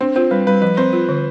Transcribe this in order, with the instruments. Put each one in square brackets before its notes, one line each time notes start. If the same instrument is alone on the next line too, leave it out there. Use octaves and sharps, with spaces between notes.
[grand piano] C4 [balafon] D4
[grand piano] C4 [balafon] F4
[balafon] G3 [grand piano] B4
[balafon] G3 [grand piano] B4
[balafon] F3 [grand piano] B4
[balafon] C4 [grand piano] C5
[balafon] F4
D3